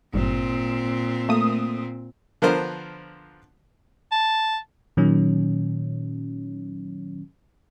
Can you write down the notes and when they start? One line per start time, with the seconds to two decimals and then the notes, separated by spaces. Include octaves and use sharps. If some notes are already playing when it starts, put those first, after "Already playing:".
0.14 G#1 G2 A#2 C4
1.29 A3 A#3 D#6
2.42 D3 F3 B3 A#4 C5
4.12 A5
4.97 A#2 D#3 F#3 C#4